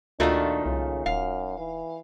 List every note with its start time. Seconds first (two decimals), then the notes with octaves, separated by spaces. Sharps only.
0.20 D2 A#2 D#3 A3 D4 D#4 F4 F#4
0.66 C2 C#3
1.06 D#1 F#2 F5
1.58 E3